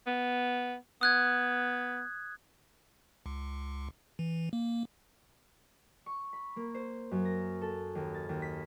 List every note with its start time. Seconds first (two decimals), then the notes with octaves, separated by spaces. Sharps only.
0.07 B3
1.01 B3 D#6 F#6 G#6
3.26 C#2
4.19 E3
4.53 A#3
6.06 C#6
6.33 B5
6.56 A#3
6.74 C5
7.11 F#2
7.25 A#6
7.61 A4
7.95 D#2
8.14 A6
8.29 D#2
8.42 B6